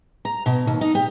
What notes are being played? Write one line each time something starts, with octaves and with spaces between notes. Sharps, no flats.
A#5
B2
D#2
D#4
G4